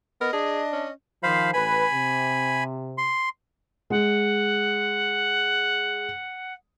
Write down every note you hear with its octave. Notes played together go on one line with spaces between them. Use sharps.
B3 A#4 D#5
D4 G#4
C#4
D#3 F3 C5 F5 B5
A1 B4 G#5 B5
C3
C6
G#3 F#5